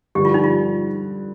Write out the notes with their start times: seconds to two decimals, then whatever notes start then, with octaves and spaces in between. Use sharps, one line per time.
0.15 G2 D3 F3 G4
0.25 F4
0.34 D#4
0.44 F4